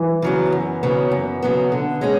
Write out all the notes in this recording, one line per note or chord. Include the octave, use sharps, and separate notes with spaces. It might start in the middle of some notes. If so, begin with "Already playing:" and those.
Already playing: E3
C#3 F#3 B3
F#2
C#3 F#3 B3
F#2
C#3 F#3 B3
D3
G#3 C#4 G#4